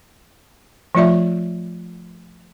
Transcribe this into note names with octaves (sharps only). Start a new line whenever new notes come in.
F3 A3 F4 D5 E5